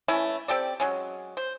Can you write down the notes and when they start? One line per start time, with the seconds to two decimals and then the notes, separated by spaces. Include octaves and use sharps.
0.08 E3 A3 C#4 E4
0.48 C4 G4 A4 D5
0.80 F#3 G#3 C#4
1.37 C5